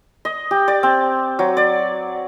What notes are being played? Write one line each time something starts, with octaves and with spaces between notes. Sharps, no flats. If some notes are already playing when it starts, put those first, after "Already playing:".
D#5
G4
D5
C4
F#3
D5